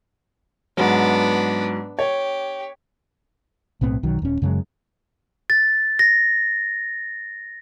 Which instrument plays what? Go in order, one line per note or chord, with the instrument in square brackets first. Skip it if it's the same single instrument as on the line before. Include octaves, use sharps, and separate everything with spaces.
[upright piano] G#2 F#3 [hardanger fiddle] B3 D4
[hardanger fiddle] G4 [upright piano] C#5
[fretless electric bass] B1 A2 B3 C4
B1 D#3 F#3
D#1 C#4
F#2 C#3 F#3 G#3
[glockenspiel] A6
A#6